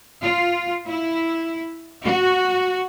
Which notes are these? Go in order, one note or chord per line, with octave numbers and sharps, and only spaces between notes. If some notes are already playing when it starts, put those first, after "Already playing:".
F4
E4
F#4